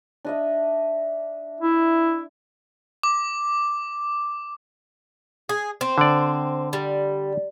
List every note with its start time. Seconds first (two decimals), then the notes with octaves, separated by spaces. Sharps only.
0.25 D4 D#5 E5
1.61 E4
3.03 D6
5.49 G#4
5.81 C4
5.98 D3 D5
6.73 G3